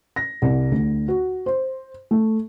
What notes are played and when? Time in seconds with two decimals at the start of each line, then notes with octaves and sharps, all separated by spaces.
0.16 A#6
0.42 C2
0.71 D2
1.08 F#4
1.46 C5
2.11 A3